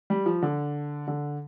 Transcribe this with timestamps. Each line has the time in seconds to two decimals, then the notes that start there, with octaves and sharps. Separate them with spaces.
0.10 G3
0.26 F3
0.42 D3
1.08 D3